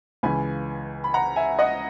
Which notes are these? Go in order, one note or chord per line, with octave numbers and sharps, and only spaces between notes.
C#2 C#3 E3 G#5 B5
B5
F#5 A#5
E5 G#5
D#5 F#5